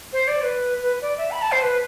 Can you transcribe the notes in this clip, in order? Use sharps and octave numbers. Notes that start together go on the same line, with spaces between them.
C5
D5
B4
B4
D5
E5
B5
A5
C5
B4